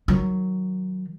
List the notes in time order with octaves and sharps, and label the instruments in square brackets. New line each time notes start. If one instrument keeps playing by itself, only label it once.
[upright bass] D#3 F#3